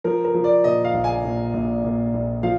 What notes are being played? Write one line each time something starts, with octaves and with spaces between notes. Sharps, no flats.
F3 A#4
A#4
F3
D5
A#2 D#5
F5
A#1
G#5
A#2
A#1
A#2
A#1
F3 F5